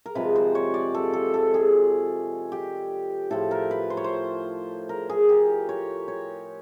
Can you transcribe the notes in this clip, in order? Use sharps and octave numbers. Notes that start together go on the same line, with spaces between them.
A#4
C3 F3 G#3 B4
C5
C#5
D5
A4
A4
A4
G#4
G4
A2 F3 A3 A4
A#4
B4
C5
C#5
C5
A#4
G#4
G4
C#5
C#5